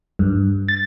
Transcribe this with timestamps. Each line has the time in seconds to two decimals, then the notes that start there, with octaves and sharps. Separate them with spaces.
0.19 G2
0.68 A6